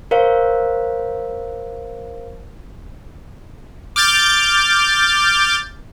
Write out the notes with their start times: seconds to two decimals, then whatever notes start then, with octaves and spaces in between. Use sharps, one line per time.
0.11 A#4 C5 C#5 F5
3.96 D6 F6 G6 A6